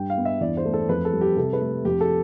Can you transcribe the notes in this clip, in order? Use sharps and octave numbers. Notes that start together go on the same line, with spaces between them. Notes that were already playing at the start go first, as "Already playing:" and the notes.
Already playing: G2 G3 G5
F5
B3
E5
E2 D5
C5
A3
A4
F2 B4
A4
G3
G4
C3 A4
B4
A3
F2 G4
A4